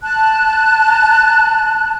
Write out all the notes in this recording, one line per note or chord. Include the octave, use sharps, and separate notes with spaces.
A5 F#6